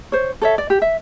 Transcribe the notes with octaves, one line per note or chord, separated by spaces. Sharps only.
C5 C#5
A4 C#5 E5
D5
G4
E5